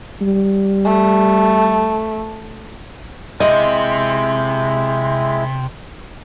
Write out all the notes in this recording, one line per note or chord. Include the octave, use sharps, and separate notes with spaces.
G3
A3
C3 G#3 E4 D#5